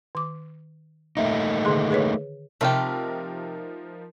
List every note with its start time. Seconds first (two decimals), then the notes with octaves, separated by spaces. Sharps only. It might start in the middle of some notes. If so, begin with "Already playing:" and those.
0.15 D#3 D6
1.17 A3 A#3 D#4 E5
1.65 D3 D#3 G#4
1.90 G#4 B4 C#5
2.61 C3 F3 A3 D#4 F4 G4 A#4